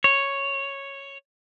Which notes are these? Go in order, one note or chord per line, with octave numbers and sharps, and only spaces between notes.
C#5